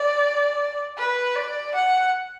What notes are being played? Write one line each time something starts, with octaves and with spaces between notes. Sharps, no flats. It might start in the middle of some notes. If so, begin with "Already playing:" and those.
Already playing: D5
B4
D5
F#5